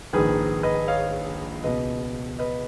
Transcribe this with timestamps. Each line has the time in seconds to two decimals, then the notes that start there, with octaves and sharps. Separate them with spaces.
0.13 A#1 G#2 D#3 G#4 B4
0.63 B4 D#5
0.88 C#5 F5
1.63 C#2 B2 B4 D#5
2.39 B4 D#5